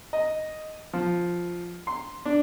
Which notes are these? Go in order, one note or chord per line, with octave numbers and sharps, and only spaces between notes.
D#5
F3
C6
D4